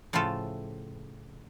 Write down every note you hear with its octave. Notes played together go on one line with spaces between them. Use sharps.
A2 C#3 F3 A3 F4 A4